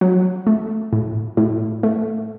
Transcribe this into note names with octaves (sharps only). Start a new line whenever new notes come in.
F#3
A3
A2
A2
A3